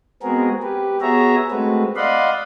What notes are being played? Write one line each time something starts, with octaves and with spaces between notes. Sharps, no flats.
G#3 B3 C4 F#4 G#4 A#4
G4 B4
B3 F#4 G#4 C#5 E5 A#5
G#3 A3 C4 F#4 B4
D5 D#5 F5 F#5 B5 C6